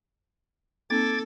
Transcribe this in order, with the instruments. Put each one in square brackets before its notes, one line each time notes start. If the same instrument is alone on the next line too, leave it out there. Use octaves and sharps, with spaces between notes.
[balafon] A#3 C4 D#4 [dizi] A4 [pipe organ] D6 G#6 A6